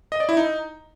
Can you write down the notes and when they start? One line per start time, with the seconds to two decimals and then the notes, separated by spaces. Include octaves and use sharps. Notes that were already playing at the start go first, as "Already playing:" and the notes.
0.12 D#5
0.20 D5
0.29 E4
0.37 D#4